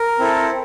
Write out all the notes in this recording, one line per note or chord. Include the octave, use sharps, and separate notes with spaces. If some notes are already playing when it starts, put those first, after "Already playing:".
Already playing: A#4
C4 E4 A4